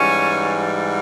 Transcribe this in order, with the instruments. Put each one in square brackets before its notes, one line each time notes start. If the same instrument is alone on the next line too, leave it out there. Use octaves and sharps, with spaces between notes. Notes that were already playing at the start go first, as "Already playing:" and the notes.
Already playing: [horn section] G#2 E3 G3 C#4